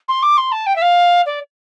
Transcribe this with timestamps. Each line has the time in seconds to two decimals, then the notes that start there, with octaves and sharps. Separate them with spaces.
0.08 C6
0.23 D6
0.37 C6
0.52 A5
0.66 G5
0.76 E5
0.82 F5
1.26 D5